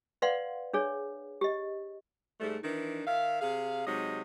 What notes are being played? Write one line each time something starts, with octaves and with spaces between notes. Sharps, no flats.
B4 D5 F5 F#5 C6
D4 G#4 C#5
G4 D#5
G#2 G3 A3
D#3 E3 D4 D#4
D#3 E5 F5
C3 G#4 F5
C3 F#3 G#3 D#4 D#5